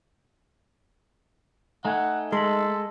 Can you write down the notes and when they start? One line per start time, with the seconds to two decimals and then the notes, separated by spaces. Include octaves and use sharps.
1.85 A3 D#4 F#5 G#5 G#6
2.32 G#3 A4 C6 B6 F#7